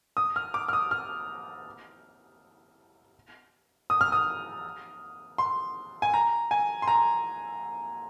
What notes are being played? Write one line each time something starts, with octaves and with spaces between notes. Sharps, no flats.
D#6
F6
D6
F6
D#6
F6
D#6
F6
D#6
C6
G#5
A#5
G#5
C6
A#5